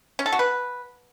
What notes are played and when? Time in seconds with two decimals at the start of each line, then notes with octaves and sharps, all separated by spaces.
0.19 C#4
0.26 A4
0.32 F#4
0.39 B4